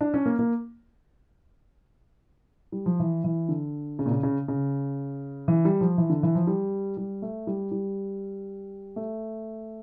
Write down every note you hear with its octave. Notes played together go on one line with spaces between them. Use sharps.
D4
C#4
A#3
A#3
G3
F3
E3
E3
D3
C#3
A#2
C#3
C#3
C#3
E3
G3
F3
E3
D3
E3
F3
G3
G3
A3
G3
G3
A3